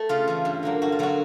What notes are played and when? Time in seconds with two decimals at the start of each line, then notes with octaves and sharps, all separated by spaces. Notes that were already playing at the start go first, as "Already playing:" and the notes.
Already playing: A3
0.09 C#3 F4
0.28 E3 A3
0.45 G2
0.63 D3 F#3 A#3
0.82 G2 F#4
0.92 F4
0.99 D3 F#3 A#3 F#4